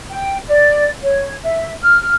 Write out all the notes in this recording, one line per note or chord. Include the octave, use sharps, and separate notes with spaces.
G5
D5
C#5
E5
F6